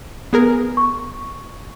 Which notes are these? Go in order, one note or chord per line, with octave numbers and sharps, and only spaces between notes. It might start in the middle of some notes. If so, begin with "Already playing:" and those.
B3 G#4 A#4
C#6